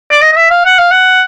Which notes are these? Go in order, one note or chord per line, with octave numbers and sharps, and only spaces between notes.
D5
D#5
D#5
E5
F5
F#5
F5
F#5